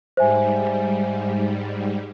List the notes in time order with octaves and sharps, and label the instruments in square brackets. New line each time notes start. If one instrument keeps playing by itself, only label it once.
[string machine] G#2 G3 [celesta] C5 E5 G#5